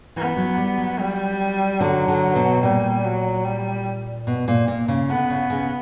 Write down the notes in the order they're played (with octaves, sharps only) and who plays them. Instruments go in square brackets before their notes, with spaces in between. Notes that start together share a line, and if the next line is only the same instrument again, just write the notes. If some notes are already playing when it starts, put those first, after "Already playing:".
[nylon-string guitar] E3 [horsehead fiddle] B3
[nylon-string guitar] F#3
G3
F#3
[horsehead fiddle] G3
[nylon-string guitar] D3 [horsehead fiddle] F#3
[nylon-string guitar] D3
B2
[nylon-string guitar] A#2 [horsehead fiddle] G3
[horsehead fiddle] F#3
G3
[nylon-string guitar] B2
A#2
A#2
C#3
[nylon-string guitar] D3 [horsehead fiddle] B3
[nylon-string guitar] C#3
C#3